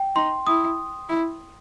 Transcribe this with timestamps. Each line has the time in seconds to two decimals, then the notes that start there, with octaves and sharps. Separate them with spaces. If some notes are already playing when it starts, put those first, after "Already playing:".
Already playing: G5
0.15 D#4 C6
0.47 E4 D#6
1.09 E4